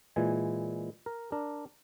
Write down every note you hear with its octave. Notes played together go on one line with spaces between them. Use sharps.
A#2 E3 G#3 G#5
A#4
D4 A#4